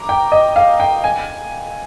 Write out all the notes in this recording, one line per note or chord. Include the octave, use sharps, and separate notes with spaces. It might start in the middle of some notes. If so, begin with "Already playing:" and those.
Already playing: A#5 D6
G5
D#5
F5
G5
G#5